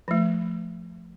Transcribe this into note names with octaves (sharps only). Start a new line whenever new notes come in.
F3 A3